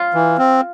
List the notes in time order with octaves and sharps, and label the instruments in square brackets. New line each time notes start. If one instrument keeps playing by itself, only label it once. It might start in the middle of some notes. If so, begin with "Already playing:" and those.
Already playing: [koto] F4
[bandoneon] E3
C4